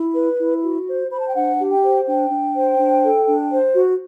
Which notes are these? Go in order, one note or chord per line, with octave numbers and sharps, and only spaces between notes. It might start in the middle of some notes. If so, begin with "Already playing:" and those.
Already playing: E4
B4
E4
F#4
C5
C5 B5
A5
G5
D4 F#5
G4
G5
C5
D4 G5
D4
C5
D4
A4
D4
C5
F#4